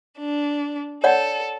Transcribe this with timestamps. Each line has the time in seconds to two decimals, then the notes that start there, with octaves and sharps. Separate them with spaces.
0.19 D4
1.04 A4 C#5 D5 F#5